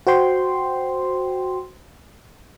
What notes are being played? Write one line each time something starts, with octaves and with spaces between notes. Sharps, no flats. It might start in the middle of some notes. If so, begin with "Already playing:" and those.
F#4 C5 G5 C6